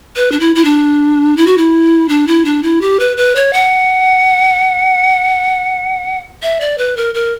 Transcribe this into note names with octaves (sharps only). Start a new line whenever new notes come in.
B4
D4
E4
E4
D4
E4
F#4
E4
D4
E4
D4
E4
G4
B4
B4
C#5
F#5
E5
D5
B4
A#4
A#4